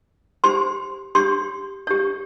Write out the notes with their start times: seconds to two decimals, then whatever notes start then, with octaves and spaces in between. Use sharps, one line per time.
0.44 G4 C5 C6
1.15 G4 C#5 C6
1.87 G4 C#5